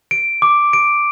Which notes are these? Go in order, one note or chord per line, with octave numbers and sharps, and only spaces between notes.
D7
D6
D7